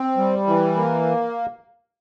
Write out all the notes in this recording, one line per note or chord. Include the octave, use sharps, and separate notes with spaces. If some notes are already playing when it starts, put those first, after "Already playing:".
Already playing: C4
G3
E3
A#3